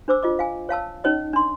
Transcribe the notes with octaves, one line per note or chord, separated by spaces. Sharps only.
D4 C5 D6 E6
F4 D#5 D6
F5 G#5
C#5 F5 A5 E6
C#4 D#4 C#5 D#5
D4 C6